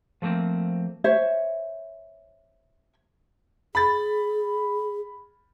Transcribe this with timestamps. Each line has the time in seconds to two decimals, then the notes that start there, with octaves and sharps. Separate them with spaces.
0.22 F3 A3 A#3 C4
1.04 C5 C#5 E5
3.75 G#4 B5 A6